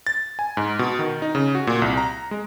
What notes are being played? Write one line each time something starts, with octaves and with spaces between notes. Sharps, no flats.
A6
G#5
G#2
B2
D#3
D#4
C#3
F#4
A#2
C2
A#5
G#3